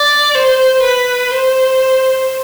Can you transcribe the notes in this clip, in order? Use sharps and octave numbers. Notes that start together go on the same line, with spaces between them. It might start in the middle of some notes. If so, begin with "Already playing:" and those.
Already playing: D5
C5
B4
C5